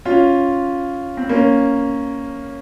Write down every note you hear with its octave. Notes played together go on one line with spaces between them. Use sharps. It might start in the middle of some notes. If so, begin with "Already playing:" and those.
C#4 F4
C4
A#3 C#4